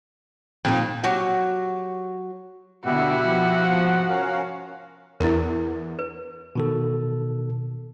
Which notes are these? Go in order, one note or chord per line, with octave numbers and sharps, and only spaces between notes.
F2 A#2 D#3 C4
F#3 F#4 G4
B2 D3 E4 F#4 G4 E5 F#5
F3
G#2 C3 B3
C#4 A#4 F5
E2 E4 A#4
B4
B2 D#3 A4